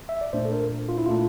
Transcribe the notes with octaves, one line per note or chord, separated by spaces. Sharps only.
E5
D5
A#2 A3 D4 C5
A4
A#4
F4
E4
A#2 A3 D4 F4